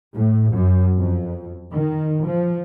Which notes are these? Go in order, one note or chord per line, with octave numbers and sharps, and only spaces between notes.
A2
F#2
F2
D#3
F3